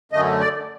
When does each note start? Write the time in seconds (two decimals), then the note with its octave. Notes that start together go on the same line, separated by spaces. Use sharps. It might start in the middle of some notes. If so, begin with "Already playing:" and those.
0.12 F#2 D3 A3 D#5
0.40 D5